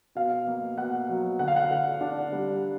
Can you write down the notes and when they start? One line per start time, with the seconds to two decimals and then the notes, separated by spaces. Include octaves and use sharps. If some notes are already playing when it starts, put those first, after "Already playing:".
0.15 B2 F5
0.47 A#3
0.78 B2 F#5
1.09 F#3
1.39 D3 F#5
1.48 F5
1.56 F#5
1.71 D3
2.01 D4
2.32 G3